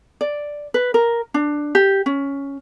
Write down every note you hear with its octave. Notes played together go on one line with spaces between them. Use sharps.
D5
B4
A#4
D4
G4
C#4